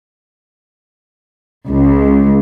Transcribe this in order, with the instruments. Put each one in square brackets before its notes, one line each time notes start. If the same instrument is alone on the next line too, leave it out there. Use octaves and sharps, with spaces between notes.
[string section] C#2